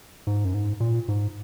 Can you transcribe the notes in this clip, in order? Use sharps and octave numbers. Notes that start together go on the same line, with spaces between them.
G#2
F#2
G#2
A#2
G#2